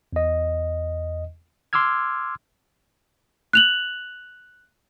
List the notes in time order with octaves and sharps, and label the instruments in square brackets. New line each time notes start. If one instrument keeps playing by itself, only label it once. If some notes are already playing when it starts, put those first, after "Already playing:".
[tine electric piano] E2 D#5
C6 D6 E6 F6 G#6
[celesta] F#6 F7 F#7